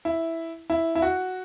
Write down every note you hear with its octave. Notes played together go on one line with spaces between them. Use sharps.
E4
E4
E4
F#4